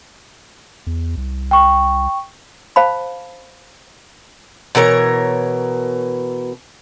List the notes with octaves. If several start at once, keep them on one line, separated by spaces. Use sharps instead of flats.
E2
C2
G5 C#6
C5 F5 A5 B5
B2 E3 A#4 C#5